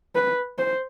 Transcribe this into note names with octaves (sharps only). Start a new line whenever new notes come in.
B4
C5